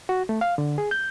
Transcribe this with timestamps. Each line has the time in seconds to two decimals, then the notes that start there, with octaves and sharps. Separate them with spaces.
0.09 F#4
0.29 A3
0.41 F5
0.58 D3
0.78 G#4
0.91 G6